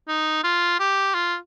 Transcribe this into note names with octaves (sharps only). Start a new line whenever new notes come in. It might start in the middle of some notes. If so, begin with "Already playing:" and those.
D#4
F4
G4
F4